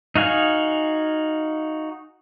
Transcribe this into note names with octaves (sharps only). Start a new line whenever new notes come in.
D#4 F#4 F5 G#5